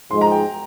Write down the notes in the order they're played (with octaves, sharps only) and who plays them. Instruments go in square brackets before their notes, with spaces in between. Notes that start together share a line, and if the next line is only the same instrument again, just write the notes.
[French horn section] G#2 F3 G#3 [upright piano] C6
[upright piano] A#5
G5